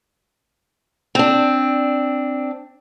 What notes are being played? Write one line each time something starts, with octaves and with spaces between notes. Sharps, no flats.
C4 D4